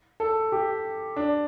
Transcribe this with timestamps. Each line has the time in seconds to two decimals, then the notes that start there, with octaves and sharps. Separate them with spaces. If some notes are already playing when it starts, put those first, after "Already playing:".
0.20 A4
0.52 G4
1.16 D4